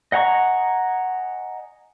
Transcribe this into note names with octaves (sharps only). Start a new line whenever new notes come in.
D#5 F#5 G#5 A#5 C#6